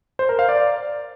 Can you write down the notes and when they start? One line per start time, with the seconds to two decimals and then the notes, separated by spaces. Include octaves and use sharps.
0.19 C5
0.29 A#4
0.39 F5
0.49 D5